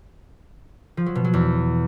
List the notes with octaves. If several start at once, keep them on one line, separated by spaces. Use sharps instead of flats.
F3
F#3
B2
F#3
E2